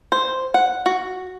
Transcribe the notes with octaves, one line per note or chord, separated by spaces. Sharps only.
C5
F#5
F#4